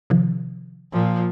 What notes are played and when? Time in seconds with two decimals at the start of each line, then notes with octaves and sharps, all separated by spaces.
0.10 C3 D#3 F3
0.93 A#2 F3